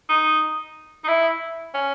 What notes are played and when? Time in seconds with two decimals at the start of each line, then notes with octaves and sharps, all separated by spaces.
0.09 D#4
1.04 D#4
1.08 E4
1.74 C#4